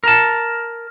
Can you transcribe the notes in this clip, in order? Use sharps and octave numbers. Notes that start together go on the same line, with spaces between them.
A#4 A5